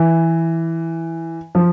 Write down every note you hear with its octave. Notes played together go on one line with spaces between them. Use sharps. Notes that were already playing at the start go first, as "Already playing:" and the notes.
Already playing: E3
F3